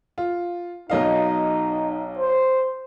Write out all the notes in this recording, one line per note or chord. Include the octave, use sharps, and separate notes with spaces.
F4
B1 D#4 D#5 F5
C5